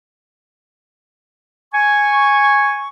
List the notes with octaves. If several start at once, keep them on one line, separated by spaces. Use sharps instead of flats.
G#5 C#6